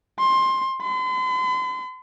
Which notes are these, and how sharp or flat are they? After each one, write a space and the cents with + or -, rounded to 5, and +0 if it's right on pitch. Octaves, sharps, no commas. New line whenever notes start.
C6 +20
C6 -45